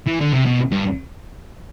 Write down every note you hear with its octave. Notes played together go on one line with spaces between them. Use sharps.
E3
D3
C3
B2
G2